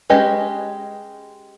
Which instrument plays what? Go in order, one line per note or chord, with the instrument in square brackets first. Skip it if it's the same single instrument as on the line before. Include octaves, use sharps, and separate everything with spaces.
[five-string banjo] G#3 C#4 G4 B4 D#5